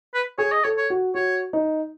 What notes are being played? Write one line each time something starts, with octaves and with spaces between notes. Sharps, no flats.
B4
G#4 C#5
D#5
A4 C#5
C#5
F#4
F#4 C#5
D#4